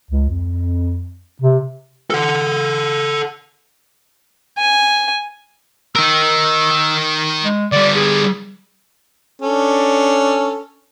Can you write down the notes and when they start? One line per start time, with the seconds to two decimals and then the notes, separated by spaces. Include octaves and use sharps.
0.11 C#2
0.29 F2
1.42 C3
2.10 A4 F#5
4.58 G#5
5.95 D#4 A#4 E6
7.44 G#3
7.72 D3 G3 D5
7.96 G#4
9.41 C#4 D4 A4